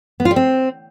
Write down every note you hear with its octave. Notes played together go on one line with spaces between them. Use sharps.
B3
F4
G3
C4